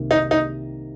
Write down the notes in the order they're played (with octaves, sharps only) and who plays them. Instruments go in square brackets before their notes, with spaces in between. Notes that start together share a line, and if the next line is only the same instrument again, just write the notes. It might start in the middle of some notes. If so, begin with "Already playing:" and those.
Already playing: [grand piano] C2 C3 D#3 A#3
[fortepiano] D#4
D#4